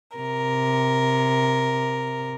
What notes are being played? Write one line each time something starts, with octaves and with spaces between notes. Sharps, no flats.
C3 A#4